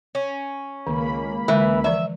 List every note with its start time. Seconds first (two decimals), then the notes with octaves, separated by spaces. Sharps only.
0.15 C#4
0.87 C#2 D#3 A#3 B5
1.48 D3 E3 G#3 B4
1.84 E3 F3 D5 E5